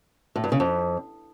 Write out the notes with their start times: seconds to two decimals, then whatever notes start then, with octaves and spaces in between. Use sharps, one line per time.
0.36 A2
0.44 G2
0.52 C#3
0.60 F2